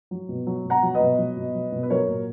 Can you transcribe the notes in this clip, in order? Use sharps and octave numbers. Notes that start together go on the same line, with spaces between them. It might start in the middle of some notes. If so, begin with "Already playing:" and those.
F#3
B2
F#3
B2
F#5 A#5
F#3
B4 D#5
B2
F#3
B2
F#3
B2
B4
F#3 A#4 C#5
A#2